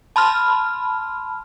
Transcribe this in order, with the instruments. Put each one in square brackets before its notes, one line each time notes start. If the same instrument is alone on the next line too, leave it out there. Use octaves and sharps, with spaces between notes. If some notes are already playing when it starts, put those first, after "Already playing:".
[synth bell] A5 B5 C6 F6